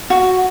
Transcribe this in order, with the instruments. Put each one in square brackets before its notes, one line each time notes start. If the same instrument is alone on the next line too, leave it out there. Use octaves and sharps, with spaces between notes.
[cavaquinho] F#4